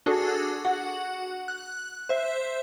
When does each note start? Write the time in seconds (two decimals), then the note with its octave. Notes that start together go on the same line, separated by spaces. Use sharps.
0.06 D4 F#4 G#4 A4
0.65 F#4 F#5
1.48 F#6
2.09 C5 E5